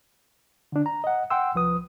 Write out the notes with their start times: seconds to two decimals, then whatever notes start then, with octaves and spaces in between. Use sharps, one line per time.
0.72 D3 D4
0.86 A#5
1.04 D#5 F#5
1.30 F#5 G5 C6 E6
1.55 C2 F3 B4 D#6